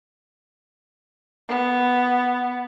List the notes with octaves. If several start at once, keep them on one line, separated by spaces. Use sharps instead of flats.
B3